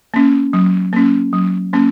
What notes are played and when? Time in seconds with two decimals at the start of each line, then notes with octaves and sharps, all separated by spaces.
0.14 A#3 C#4
0.53 F#3
0.93 A#3 C#4
1.33 F#3
1.73 A#3 C#4